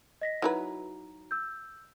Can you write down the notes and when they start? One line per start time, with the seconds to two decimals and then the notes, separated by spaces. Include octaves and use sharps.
0.21 D#5 A#6 B6
0.42 F#3 D#4 E4 F#4 B4 A#5
1.31 E6 G6